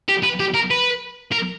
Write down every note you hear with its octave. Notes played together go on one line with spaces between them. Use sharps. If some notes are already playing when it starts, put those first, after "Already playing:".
G4
B4
G4
A#4
B4
A#4